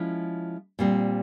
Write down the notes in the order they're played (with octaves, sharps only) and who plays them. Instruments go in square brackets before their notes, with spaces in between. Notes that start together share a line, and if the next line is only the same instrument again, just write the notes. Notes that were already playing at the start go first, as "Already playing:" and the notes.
Already playing: [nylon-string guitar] F3 G#3 C#4 E4
A#2 G3 C4